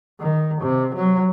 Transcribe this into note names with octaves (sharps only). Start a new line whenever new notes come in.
D#3
C3
F#3